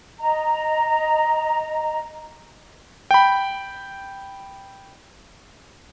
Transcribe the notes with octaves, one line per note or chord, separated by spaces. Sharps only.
D#5 A#5
G5 B5